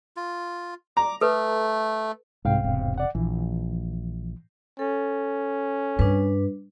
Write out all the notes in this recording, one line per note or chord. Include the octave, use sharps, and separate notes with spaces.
F4
A#5 D6
A3 A4 B4
C2 G#2 C3 F5 G5
E1 C3
D5 F#5
A#1 E3
C#4 A4
G2 D4 B4